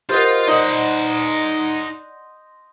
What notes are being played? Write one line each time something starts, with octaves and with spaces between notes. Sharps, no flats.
F4 G4 A#4 C5 D#5 F5 F#5
D#4 D5 D#5 F#5